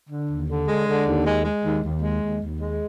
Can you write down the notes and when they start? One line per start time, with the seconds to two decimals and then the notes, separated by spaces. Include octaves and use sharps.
0.10 D3
0.29 D#2
0.48 D3
0.67 G#3
0.87 D3
1.06 D#2
1.25 G#3
1.45 G#3
1.63 D#2
1.82 D#2
2.02 G#3
2.21 D#2
2.40 D#2
2.59 G#3